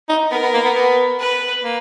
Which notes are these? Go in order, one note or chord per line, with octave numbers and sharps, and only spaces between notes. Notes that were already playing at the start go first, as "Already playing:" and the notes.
D#4
B3 A#4
B3
A#3
B3
B3
B4
A#3